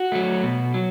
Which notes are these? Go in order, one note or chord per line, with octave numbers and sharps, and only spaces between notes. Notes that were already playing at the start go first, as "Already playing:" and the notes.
Already playing: F#4
F#3 A3
B2
F#3